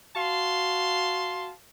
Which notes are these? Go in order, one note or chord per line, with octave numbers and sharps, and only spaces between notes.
F#4 F5 A5 C6